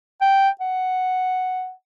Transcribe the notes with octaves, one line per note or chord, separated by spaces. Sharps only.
G5
F#5